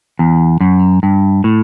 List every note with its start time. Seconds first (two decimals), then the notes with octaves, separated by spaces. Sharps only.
0.19 E2
0.61 F#2
1.03 G2
1.44 A2